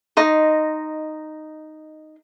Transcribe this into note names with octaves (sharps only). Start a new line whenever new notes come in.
D#4 D#5 C6